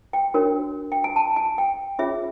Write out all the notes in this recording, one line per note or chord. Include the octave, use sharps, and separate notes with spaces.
G5
D4 F#4 A#4 C#5
G5
G#5
A5
G#5
G5
C#4 F4 G#4 C#5 E5